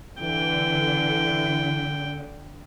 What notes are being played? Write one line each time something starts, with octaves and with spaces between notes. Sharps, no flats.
D3 E3 G5